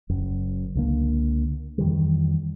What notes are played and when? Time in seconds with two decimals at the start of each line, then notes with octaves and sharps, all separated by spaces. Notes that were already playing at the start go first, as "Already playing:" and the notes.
0.10 F#1 F#2
0.75 C#2 D3 A#3
1.78 F2 D#3 E3 G3